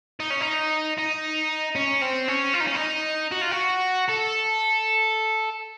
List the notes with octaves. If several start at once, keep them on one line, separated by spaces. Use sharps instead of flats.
D#4
C#4
D#4
D#4
C#4
C4
C#4
F4
D#4
C#4
D#4
F#4
F4
F#4
A4